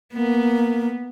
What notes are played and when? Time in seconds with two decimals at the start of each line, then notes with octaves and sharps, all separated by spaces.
0.14 A#3 B3